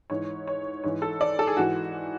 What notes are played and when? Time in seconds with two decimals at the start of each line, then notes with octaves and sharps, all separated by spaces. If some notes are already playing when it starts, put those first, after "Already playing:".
0.10 G#2 E3 C#5
0.47 C#5
0.84 G#2 E3 C#5
1.02 A4
1.21 D5
1.39 A4
1.47 G#4
1.57 G#2 E3 F#4